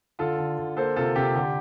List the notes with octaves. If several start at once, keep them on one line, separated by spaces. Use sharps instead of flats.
D3 F4 A4
D3
D3
A#3 A4 C5
C3 F4 A4
C3 G4
D3 G4